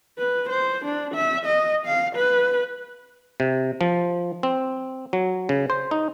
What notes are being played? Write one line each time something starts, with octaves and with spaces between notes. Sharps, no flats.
B4
C5
D4
E5
D#5
F5
B4
C3
F3
C4
F#3
C#3
C5
D#4